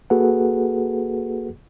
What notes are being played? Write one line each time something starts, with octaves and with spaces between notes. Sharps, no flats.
A#3 F#4 G#4 A4 B4 F#5